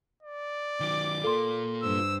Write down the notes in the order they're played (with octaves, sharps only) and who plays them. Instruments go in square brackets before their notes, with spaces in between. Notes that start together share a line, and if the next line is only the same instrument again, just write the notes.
[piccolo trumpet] D5
[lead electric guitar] D#3 F#3 [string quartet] D6
[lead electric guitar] A#3 F4 [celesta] A4 C6
[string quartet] G2 C5 [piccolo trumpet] E6